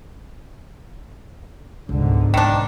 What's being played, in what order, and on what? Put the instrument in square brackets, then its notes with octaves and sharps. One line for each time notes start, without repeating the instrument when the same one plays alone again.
[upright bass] C#2 G3 [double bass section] G#2 B2 D3
[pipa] D#3 D4 [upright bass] E3 C#4